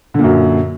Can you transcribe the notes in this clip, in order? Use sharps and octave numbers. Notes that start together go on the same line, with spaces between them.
F#2 A#2 D3